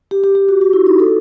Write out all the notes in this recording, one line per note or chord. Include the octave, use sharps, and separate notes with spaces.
G4
G4
G4
F#4
F#4
E4
D#4
A4